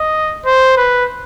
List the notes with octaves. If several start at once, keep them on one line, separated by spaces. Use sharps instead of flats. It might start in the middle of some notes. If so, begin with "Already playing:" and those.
Already playing: D#5
C5
B4